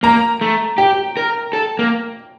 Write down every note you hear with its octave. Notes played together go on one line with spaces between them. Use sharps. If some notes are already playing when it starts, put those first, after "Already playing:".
A#3 A#5
A3
G4 G5
A#4
A4
A#3